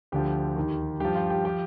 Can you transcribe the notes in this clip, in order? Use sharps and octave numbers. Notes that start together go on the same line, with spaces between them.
D2 D3 F3 G4
D#2 D#3
G2 F3 G4
F4
G4
F3 G4